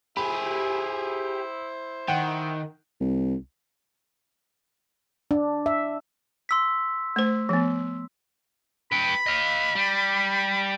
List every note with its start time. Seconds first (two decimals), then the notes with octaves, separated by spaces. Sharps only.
0.17 E4 G4 G#4 C5 B5
2.08 D#3 F#5 G5
3.00 C2
5.31 D4
5.66 E5
6.49 C6 E6 B6
7.16 A3 C5
7.49 F3 B3
8.92 B4 G5 B5
9.26 D#5 F5
9.75 G3